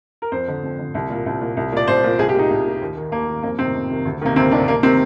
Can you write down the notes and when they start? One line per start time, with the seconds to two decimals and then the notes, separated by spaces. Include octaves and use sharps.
0.22 A#4
0.32 F2 C5
0.48 D3
0.63 F2
0.79 D3
0.94 C2
1.10 A#2
1.26 C2
1.41 A#2
1.57 C2
1.72 A#2 D5
1.88 C2 C5
2.04 A#2
2.18 C2 G#4
2.29 G4
2.34 A#2 D#4
2.50 C2
2.66 A#2
2.81 D#2
2.97 D#3
3.12 D#2 A#3
3.27 D#3
3.43 F2 A#3
3.59 C3 D#3 C4
3.74 F2
3.90 C3 D#3
4.05 D2
4.21 C3 D#3 A#3
4.36 D2 C4
4.51 C3 D#3 D4
4.67 C2 A#3
4.83 C3 D#3 C4